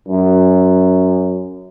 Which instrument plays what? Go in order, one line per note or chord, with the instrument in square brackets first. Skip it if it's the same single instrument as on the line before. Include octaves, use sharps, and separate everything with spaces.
[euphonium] F#2